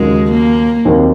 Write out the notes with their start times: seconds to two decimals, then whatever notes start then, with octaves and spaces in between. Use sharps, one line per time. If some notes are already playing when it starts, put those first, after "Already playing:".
Already playing: D#2 C#3 F#3 G#3
0.32 A#3
0.85 D#2 D#3 F#3 C4 F#4